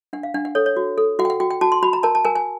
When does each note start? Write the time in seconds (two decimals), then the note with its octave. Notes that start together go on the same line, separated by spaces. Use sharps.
0.13 D4 F#5
0.23 F5
0.34 D4 F#5
0.45 F#5
0.55 A4 C#5
0.66 C#5
0.77 F#4
0.98 A4
1.19 F#4 F#5
1.25 G5
1.30 F#5
1.40 F#4 G5
1.50 G5
1.61 F#4 A5
1.72 C6
1.83 F#4 B5
1.93 A#5
2.03 A#4 A5
2.15 A5
2.25 A#4 G#5
2.35 G#5